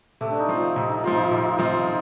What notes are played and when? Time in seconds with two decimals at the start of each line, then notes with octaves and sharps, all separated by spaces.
0.21 C3 A3
0.31 D4
0.39 D#4
0.49 F3 C4
0.57 F4
0.76 C3 D#4
0.89 D#4
1.04 F3 C4 F4
1.18 D#4
1.31 C3 F4
1.45 F4
1.59 F3 C4 D#4
1.73 D#4